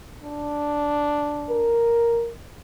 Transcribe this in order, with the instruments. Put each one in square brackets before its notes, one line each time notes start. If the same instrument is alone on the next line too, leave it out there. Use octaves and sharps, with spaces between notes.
[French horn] D4
[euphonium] A#4